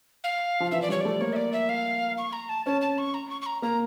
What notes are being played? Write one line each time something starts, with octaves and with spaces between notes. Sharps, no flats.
F5
F3
E3 E5
D5
G3 C#5
A3 D5
A#3 C#5
E5
D5
E5
F5
C#6
A#5
A5
C#4 A5
A5
C#6
A#5
C#6
C#6
A#5
A#3 A#5